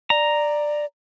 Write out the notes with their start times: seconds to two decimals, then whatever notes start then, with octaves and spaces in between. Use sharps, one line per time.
0.10 D5 A#5